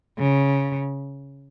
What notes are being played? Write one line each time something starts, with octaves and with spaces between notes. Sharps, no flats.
C#3